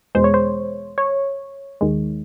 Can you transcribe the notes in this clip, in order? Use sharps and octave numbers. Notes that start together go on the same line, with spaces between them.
E2 B2 G#3 C5
C#5
C5
C#5
D#2 D#3 G#3